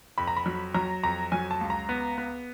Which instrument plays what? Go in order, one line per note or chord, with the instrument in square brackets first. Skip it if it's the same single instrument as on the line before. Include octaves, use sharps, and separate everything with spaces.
[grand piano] F2 B5
A#5
B5
F#3
F#3 A#5
F2 A#5
F#3 G#5
A5
C#2
A#5
B3
B3